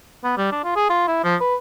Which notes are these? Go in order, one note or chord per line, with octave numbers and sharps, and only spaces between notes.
B3
G3
D4
F4
G#4
F4
E4
F3
B4